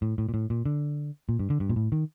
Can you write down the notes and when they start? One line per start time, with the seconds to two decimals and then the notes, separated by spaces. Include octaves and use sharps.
0.02 A2
0.18 A2
0.29 A#2
0.34 A2
0.50 A#2
0.66 D3
1.29 A#2
1.39 G2
1.50 D3
1.60 G2
1.70 A#2
1.76 A2
1.92 D#3